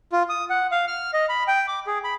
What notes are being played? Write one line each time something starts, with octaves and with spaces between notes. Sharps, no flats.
F4
D#6
F#5
F5
F6
D#5
B5
G5
D6
G#4
B5